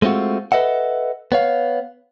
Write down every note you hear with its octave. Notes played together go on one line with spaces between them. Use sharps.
G#3 A3 C4 F4 F#4
A4 B4 D#5 E5 F#5
B3 C#5 F5